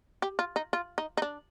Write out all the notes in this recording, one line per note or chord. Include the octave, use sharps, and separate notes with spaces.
G4
F4
D#4
F4
D#4
D#4
D4